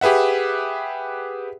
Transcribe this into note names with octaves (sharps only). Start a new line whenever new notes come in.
G4 G#4 B4 E5 F#5